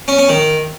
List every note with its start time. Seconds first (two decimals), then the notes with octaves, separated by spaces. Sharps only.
0.08 C#4
0.18 C#4
0.29 D#3